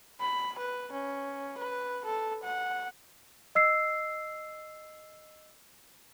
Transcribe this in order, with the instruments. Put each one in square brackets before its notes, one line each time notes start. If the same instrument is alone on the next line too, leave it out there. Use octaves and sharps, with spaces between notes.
[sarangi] B5
B4
C#4
B4
A4
F#5
[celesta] D#5 E6 C7